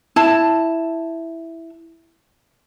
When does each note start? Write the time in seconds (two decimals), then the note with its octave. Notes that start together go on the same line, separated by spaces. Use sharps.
0.16 E4 A5